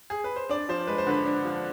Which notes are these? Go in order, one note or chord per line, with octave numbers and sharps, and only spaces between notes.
G#4
B4
C5
D4 D5
F3 C5
G#3 B4
C5
D3 B4
D4
F3